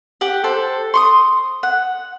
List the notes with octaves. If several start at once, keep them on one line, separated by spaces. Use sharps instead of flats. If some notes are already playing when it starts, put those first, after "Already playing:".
G4 F#5
A4 C5
C6 C#6 D#6
F#5